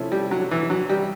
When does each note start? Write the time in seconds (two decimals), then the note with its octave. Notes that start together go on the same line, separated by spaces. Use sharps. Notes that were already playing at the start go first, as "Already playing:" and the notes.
Already playing: C3 F3 A3 C#4 E4
0.12 G3
0.31 F#3
0.51 E3
0.70 F#3
0.89 G3